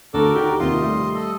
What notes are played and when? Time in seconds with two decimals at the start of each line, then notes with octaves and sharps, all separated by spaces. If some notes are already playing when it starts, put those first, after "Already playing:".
0.14 D2 F#4 A4 A#4 D5
0.35 D#4 G4 F#5
0.60 D#2 C3 F4 D#5 C6
0.81 G3 A3
1.15 A4 D#5